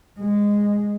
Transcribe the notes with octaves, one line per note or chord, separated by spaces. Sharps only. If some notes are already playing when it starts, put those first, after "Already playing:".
G#3